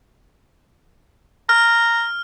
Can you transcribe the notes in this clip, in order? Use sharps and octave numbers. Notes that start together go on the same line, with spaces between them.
A#5 F6